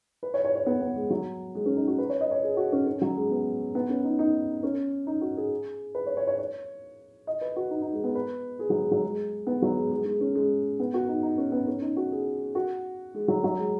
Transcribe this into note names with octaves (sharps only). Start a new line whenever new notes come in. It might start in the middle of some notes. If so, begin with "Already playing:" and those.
B4
C#5
C#5
C#5
B3
B3
G#3
F#3
G#3
C#4
D#4
F#4
B4
C#5
D#5
C#5
G#4
F#4
C#4
C#4
F#3
G#3
B3
B3
C#4
D#4
D#4
C#4
D#4
F#4
G#4
B4
C#5
C#5
C#5
C#5
D#5
B4
F#4
D#4
D#4
G#3
B3
B4
G#4
F#3
G#3
F#3
G#3
B3
F#3
G#3
G#3
G#3
C#4
G#3
B3
F#4
D#4
D#4
C#4
B3
C#4
D#4
F#4
G#4
F#4
G#3
F#3
F#3
G#3